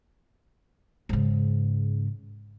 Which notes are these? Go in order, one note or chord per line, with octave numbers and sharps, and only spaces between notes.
G#2 C#3